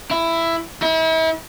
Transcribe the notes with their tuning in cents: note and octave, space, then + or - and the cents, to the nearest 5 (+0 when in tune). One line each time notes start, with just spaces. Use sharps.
E4 +10
E4 -40